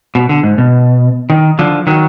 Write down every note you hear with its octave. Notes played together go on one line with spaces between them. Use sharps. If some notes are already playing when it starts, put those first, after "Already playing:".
B2
D3
G#2
B2
D#3
D3 F3
D#3 F#3